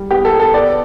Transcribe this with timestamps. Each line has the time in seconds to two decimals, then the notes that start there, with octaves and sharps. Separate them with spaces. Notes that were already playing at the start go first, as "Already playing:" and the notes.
Already playing: G3
0.11 B3 G4
0.25 A4
0.33 B3
0.40 A4
0.53 B3 D5